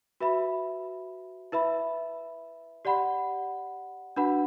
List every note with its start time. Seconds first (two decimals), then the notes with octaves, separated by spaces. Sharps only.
0.20 F#4 B4 E5 B5
1.52 E4 B4 E5 B5
2.85 G4 D5 F#5 B5
4.16 D4 F#4 B4 F#5 B5